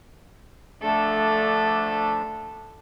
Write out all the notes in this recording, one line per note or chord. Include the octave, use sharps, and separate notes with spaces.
D3 F3 A3 D4 A4